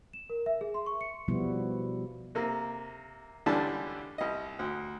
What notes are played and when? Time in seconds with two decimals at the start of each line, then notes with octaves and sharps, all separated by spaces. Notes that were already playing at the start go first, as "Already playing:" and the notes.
0.13 E7
0.30 A#4
0.46 E5
0.61 G#4
0.74 C6
0.86 C#6
1.01 C#7
1.28 B2 F3 G3 B3 E4
2.35 C3 A#3
3.46 C#2 D3 E3 G3 D4 A5
4.18 C2 D#5
4.59 D2